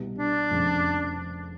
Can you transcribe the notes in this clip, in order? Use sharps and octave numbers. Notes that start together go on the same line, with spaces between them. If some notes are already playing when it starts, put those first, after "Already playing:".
Already playing: C2 B2 G3 B3
D4
F1 F2 C#3 F3